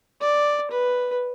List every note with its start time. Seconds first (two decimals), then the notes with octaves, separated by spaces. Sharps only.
0.21 D5
0.71 B4